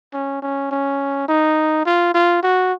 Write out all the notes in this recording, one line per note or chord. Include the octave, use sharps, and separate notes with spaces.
C#4
C#4
C#4
D#4
F4
F4
F#4